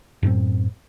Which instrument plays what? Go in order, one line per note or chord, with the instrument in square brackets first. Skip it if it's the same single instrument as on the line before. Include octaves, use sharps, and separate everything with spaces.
[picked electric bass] F#2 A2 A#3 C4